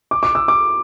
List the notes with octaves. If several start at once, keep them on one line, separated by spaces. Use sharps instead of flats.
D6
D6
E6
D6